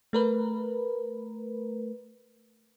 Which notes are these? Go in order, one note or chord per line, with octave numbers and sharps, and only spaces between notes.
A3 A#4 B4